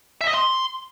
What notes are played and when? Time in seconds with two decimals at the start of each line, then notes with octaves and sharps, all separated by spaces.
0.21 E5
0.28 D#5
0.34 C6